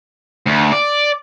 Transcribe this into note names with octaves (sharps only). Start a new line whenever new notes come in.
D2
D5